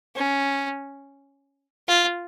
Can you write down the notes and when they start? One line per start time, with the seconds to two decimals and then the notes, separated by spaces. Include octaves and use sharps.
0.15 C#4
1.88 F4